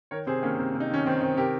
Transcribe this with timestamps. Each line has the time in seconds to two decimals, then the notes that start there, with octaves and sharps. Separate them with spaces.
0.11 D#3 A#4 C#5
0.27 C3 G#4 C5
0.43 D#3 A#3 C#4
0.59 C3
0.75 C3
0.80 D#4
0.90 D#3 C#4
1.06 D#3 C4
1.21 D#3 C4
1.37 C3 G4 A#4